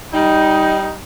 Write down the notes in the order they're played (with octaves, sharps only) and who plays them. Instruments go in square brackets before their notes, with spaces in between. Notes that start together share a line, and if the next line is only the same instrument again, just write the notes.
[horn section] G3 D#4